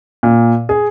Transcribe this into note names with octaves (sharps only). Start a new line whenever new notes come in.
A#2
G#4